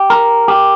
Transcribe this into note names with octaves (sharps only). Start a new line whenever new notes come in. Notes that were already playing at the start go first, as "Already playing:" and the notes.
Already playing: G4
A#4
G4